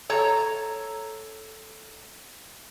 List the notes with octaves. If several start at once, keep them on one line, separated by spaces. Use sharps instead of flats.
A4 C#5 A#5